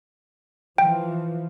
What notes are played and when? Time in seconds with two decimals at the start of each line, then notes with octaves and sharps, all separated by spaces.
0.78 E3 F3 G5